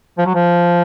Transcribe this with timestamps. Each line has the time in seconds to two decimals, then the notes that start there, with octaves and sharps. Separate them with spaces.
0.18 F3
0.26 F#3
0.34 F3